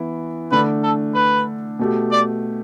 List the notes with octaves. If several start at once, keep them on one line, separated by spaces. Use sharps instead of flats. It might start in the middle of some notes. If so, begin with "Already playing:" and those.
Already playing: E3 B3 E4
D3 A3 D4 B4
A4
B4
B2 A3 G4
D5